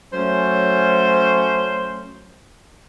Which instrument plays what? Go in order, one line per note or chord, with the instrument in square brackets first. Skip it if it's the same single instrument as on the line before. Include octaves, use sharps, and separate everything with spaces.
[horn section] F#3 A3 C#4 [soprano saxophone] C5